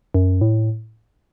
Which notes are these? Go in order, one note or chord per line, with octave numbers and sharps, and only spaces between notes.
F#2
A2